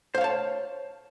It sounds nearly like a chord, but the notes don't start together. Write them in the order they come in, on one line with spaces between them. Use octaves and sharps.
C5 F5 C#5 A5